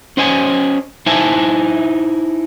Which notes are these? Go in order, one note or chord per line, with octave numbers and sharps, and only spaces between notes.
C#4 C5 D#5 G#5
D#4 E4 C5 E5 G#5 A5